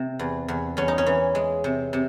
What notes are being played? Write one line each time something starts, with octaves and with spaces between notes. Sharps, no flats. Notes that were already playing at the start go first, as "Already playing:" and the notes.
Already playing: C3
E2
E2
E2 C#4
D#4
C#4
E3
G#3
C3
C3